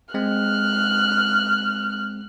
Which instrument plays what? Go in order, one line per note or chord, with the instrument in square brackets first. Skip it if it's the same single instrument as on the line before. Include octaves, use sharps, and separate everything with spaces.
[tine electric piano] G#3 C4 [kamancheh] F6 F#6